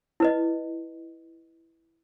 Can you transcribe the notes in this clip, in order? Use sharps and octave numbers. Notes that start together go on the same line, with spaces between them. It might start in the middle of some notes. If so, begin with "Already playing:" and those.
E4 B4 D#5